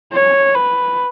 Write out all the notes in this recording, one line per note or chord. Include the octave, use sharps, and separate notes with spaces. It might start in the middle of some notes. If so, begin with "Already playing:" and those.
C#5
B4